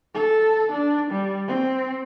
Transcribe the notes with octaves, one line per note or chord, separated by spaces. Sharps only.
A4
D4
G3
C4